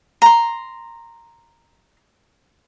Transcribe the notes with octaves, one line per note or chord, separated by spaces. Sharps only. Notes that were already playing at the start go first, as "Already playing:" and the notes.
A#5 C6